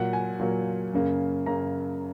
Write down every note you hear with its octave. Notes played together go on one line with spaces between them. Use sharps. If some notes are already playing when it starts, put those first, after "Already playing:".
Already playing: A#2 F#3 A#3 F#5
G#5
A#2 F#3 A#3
F#2 C#3 A#3
F#2 C#3 A#3 A#5